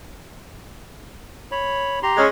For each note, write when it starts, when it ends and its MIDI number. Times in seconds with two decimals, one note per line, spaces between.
1.52 1.99 73
1.52 1.99 83
2.03 2.20 67
2.03 2.20 82
2.03 2.20 84
2.16 2.26 56
2.16 2.26 61